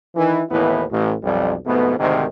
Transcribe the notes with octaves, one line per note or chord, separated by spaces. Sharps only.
D#3 E3
D#2 A2 E3 B3 E4 B4
A1
B1 F2 G3
F2 G#2 B2 A3 B3
D2 G#2 C3 D#3